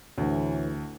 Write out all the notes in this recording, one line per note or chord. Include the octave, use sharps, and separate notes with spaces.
D2 A2 E3